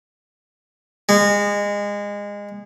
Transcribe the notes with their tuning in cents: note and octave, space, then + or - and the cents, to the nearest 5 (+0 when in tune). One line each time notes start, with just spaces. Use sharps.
G#3 -25